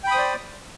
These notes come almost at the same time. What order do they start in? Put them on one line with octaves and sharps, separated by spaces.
G5 B5 D#6 C5 D5